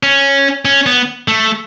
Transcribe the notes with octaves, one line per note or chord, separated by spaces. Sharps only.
C#4
C#4
B3
A3